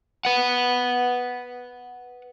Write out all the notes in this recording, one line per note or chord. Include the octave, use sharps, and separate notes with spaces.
B4 F#5